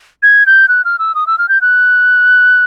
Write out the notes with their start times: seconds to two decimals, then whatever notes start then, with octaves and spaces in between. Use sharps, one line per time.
0.23 G#6
0.46 G6
0.68 F#6
0.85 F6
0.99 E6
1.15 D#6
1.27 E6
1.38 F6
1.49 G6
1.61 F#6